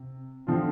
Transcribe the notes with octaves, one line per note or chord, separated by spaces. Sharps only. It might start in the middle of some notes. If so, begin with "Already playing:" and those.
Already playing: C3
D3 F3 C4 F4